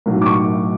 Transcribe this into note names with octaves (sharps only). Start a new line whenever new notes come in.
B1 A2 F#3
D6
C#6